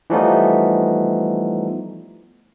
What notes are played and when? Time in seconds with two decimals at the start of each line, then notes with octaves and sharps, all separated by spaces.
0.10 E3 F3 G3 A3 B3 D#4